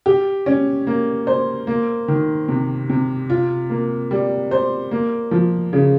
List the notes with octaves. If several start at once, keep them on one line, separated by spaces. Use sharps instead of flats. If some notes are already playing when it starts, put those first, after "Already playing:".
G4
C#4
A#3
C5
A#3
D#3
C3
C3
F4
A#3
G3
C5
A#3
F3
C#3